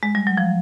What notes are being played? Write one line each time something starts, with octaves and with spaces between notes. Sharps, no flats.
G#3
G3
F#3
F3